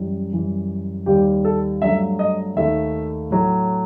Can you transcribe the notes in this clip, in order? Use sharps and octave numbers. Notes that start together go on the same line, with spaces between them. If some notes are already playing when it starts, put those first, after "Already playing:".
Already playing: F#2 E3 G3
F#2 E3 G3
D#2 D#3 G3 G4
A4
G2 F#3 A3 E5
D#5
D#2 D#3 A3 E5
A2 F#3 A3